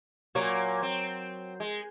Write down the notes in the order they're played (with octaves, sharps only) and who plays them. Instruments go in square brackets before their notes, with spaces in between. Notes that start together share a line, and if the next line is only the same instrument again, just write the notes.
[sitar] A#2 A#3 [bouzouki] F#3 C#5
[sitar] C4
G#3